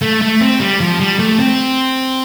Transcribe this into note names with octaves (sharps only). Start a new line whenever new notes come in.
A3
A3
C4
G3
F3
G3
A3
C4